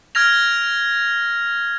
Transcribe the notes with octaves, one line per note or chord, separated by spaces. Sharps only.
F6 G#6 A#6 F7